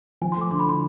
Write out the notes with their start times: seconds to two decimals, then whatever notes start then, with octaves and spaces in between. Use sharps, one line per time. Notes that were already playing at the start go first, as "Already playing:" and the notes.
0.21 F3 G#5
0.32 C6
0.36 A3 D6
0.51 D3 C6
0.59 B5
0.66 E4 C6